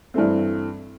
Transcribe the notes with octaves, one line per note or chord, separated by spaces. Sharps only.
G2 E3 A3 C4